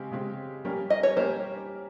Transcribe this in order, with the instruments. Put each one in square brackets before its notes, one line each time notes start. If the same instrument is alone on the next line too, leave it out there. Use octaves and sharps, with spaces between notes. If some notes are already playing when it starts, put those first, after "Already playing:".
Already playing: [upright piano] C#3 G#3 C4 G4
C#3 G#3 C4 G4
G3 A#3 C#4 G4 A#4
[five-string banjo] D#5
C#5
[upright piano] G3 A#3 C#4 G4 A#4 [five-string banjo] C5